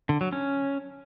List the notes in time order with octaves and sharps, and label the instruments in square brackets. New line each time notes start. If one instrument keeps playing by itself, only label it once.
[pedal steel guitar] D3
F#3
C#4